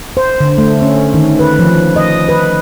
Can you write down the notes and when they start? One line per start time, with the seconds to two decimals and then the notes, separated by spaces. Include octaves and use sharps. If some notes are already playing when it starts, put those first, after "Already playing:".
0.17 C5
0.40 D3
0.58 A3
0.82 C#4
1.14 D#3
1.39 B4
1.59 F3
1.96 D#5
2.29 B4